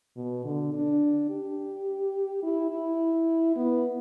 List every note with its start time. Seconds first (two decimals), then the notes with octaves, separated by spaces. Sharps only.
0.16 B2
0.44 D3
0.74 D4
1.30 G4
2.43 E4
2.70 E4
3.56 B3